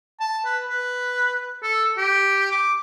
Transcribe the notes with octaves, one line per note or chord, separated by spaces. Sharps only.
A5
B4
B4
A4
G4
D6